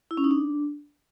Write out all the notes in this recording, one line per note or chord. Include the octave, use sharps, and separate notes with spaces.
E4
C#4
D#4
D4